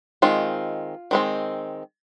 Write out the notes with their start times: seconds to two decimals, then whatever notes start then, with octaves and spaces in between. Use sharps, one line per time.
0.22 D#3 G#3 C4 F4
1.11 D#3 G#3 C4